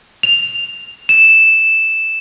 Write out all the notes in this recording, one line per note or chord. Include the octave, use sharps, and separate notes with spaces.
F7
E7